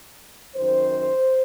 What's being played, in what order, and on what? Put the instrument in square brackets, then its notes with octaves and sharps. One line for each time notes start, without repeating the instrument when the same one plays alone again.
[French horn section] F#2 D#3 C5